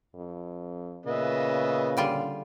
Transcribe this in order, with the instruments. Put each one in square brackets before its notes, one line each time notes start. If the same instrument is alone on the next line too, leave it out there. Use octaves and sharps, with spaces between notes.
[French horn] F2
[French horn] A#2 [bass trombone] C#3 [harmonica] B3 D#5 E5
[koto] D3 G3 F4